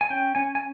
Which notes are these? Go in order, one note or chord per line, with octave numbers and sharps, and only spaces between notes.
G#5
C#4 G5
C#4 G#5
G#5